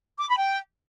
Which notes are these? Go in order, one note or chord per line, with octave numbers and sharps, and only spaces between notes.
D6
B5
G5